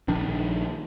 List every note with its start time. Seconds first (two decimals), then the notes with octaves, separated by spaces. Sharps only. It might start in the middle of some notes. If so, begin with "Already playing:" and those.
0.08 A#1 D#3 D4